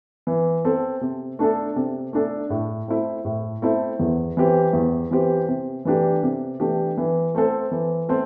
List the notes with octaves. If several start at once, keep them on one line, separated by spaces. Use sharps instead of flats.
E3
C4 A4
C3
A3 D4 A4
C3
A3 D4 A4
A2
A3 C4 E4
A2
A3 C4 E4
E2
E3 C4 G4
E2
E3 C4 G4
C3
E3 A3 D4 G4
C3
E3 A3 D4 G4
E3
A3 C4 A4 C5
E3
A3 C4 A4 C5